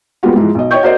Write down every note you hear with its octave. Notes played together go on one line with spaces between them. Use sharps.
G3 G#3 A#3 B3 F4 F#4
G#2 E3 F3 G#3
B1 D#5
C#5 D#5 G5 C#6 G6
F#4 A#4 C5 D5 D#5